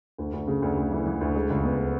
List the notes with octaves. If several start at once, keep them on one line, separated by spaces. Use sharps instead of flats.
D2
D2
C#3
D2
D2
E3
E3
D2
G#3
C#2
B3